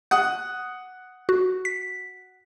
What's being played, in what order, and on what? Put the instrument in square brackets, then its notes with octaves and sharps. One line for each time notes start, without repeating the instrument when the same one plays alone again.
[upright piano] F#5 D#6 [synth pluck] F#6
[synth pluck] F#4
B6